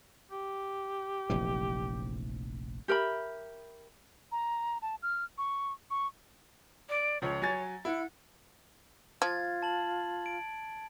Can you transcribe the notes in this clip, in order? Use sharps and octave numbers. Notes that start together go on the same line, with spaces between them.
G4
F1 A#1 E3
G4 A#4 E5 B5
A#5
A5
F6
C#6
C#6
D5
C#2 F3 C#5
F#3 G#5 A6
E4 F#5
F3 F4 G#6 A6
A5 F#7
D7